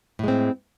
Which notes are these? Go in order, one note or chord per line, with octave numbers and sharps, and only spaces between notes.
A2 G#3 C4